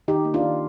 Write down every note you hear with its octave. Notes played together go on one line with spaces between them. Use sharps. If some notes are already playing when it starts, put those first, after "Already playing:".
D#3 D#4 G4
A#3
D4 F4
D#3